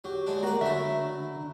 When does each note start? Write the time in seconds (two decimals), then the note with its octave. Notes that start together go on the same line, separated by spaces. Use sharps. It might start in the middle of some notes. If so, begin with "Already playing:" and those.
0.04 F#3 G4
0.26 F#3 G#3 D4
0.43 G#3 A#3 F#4 A#4 D5 F#5 A#5
0.61 D3 F#3 A3 E4 E5